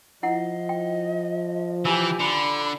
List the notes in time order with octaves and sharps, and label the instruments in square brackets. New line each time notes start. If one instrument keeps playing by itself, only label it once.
[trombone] F3 [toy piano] E4 F#5 [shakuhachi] D#5
[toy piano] G5
[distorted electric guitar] E3 [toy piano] F4 G#5 E6 [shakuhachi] G4
[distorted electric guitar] D3 [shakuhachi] B5